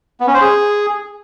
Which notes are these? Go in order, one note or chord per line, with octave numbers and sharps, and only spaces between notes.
B3
C#4
C5
G#4